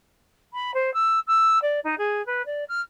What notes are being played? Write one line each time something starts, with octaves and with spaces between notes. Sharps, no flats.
B5
C5
E6
E6
D5
D#4
G#4
B4
D5
F6